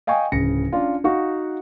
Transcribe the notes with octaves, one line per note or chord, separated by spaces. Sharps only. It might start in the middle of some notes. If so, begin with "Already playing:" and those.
D#5 F5 G5 G#5 C#6 D#6
D1 C#3 A#6 C#7
C#4 D4 F4
D#4 F#4 F5 F#5 C#6